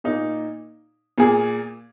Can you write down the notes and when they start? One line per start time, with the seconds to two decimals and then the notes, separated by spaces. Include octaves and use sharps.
0.04 A#2 A#3 D#4
1.18 A#2 A#3 G#4